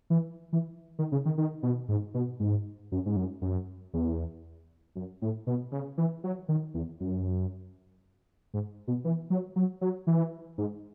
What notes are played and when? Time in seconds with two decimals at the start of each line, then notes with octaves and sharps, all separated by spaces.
0.10 E3
0.53 E3
0.99 D#3
1.12 C#3
1.25 D#3
1.38 D#3
1.63 B2
1.88 G#2
2.14 B2
2.40 G#2
2.92 F#2
3.06 G#2
3.16 F#2
3.42 F#2
3.93 E2
4.96 F#2
5.22 A2
5.47 B2
5.72 C#3
5.98 E3
6.24 F#3
6.49 D#3
6.74 E2
7.00 F#2
8.54 G#2
8.88 B2
9.05 E3
9.30 F#3
9.56 F#3
9.81 F#3
10.07 E3
10.58 G#2